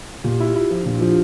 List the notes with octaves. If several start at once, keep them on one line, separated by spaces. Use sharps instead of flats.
A#2 G4
E4
F4
E4
F3
D4
A#2
E4
F3 F4